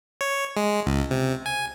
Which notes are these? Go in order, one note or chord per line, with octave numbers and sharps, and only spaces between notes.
C#5
G#3
C#2
C3
G#5